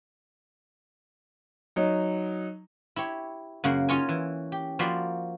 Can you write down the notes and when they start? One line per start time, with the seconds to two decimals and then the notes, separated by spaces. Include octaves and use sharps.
1.76 F#3 D#4
2.96 E4 G4 C#5
3.64 F#2 C#3 A#3 F#5
3.89 C#4 D#4 F4 C#5 D#5 G#5
4.09 E3
4.52 G4
4.79 F3 A#3 F#4 D5 B5 C6